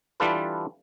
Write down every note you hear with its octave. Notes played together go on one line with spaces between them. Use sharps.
E3 G3 D4 F4 A4 B4